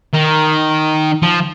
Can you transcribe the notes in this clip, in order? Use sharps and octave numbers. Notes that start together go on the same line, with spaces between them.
D#3
F3